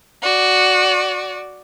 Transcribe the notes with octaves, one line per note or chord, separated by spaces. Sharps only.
F#4 D5